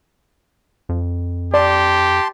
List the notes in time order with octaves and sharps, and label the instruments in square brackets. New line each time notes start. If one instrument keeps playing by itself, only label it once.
[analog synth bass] F2
[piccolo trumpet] G4 [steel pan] D5 [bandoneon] A5 C6